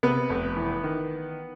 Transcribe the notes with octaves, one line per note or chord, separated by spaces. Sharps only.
C3 B3 B4
F1
E3
D#3